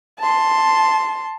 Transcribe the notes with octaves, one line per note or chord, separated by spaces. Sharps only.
A5 C6